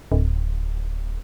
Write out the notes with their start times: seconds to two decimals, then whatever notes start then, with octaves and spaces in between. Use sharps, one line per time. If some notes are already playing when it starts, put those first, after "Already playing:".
0.12 D1